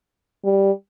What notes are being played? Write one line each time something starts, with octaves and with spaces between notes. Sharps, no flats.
G3